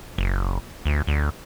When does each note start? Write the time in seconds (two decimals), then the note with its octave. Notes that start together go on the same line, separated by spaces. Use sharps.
0.18 F#1
0.86 D2
1.07 D2